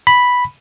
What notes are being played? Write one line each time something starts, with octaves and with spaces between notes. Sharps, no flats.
B5